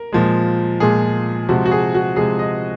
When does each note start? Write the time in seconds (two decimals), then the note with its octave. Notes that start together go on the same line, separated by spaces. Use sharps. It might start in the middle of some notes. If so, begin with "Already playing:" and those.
Already playing: A#4
0.12 A#2 F3 G#3
0.80 A#2 F3 G#3 G#4
1.49 C3 F3 G#3 F#4
1.65 F#4
1.71 G#4
1.94 F#4
2.16 C3 F3 G#3 G#4
2.39 D#5